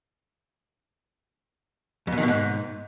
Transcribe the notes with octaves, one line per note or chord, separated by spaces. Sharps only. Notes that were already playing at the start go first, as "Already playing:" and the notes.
F2
B2
D#3
B2
G#2